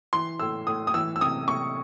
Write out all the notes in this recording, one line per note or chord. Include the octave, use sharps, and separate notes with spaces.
E3 C6
A2 E6
A2 D#6
D#6
E3 E6
E6
C3 D#6
C3 C#6